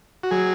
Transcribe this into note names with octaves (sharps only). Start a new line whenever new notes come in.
F#4
F#3 G#4